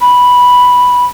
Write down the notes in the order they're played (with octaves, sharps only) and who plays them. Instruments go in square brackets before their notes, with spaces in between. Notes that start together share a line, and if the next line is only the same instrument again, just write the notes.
[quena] B5